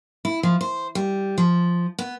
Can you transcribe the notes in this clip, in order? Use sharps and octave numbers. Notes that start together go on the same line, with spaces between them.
E4
F3
C5
G3
F3
B3